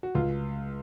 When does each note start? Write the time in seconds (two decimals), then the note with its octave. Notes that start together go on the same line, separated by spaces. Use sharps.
0.03 F#4
0.15 C#2 F4